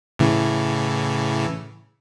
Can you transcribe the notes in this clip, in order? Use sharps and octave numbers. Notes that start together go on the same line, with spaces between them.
A2 C#3 E3